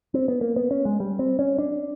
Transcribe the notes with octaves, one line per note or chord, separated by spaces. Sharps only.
C4
B3
A#3
B3
C#4
G#3
G3
C4
C#4
D4